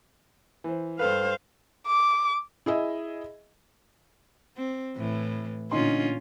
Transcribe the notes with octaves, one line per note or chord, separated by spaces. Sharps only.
E3 C5
G2 A4 B4 C5 F5
D6
E4 G#4 D#5 E5
C4
A2 E3
A#2 D3 C#4 D#4 F4 C6